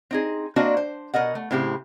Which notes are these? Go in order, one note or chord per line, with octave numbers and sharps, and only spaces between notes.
C4 D#4 G#4
A#3 C4 D4 F#4 D#5
C5
B2 A#4 D#5 F#5
A3
A2 C#3 C4 E4 G4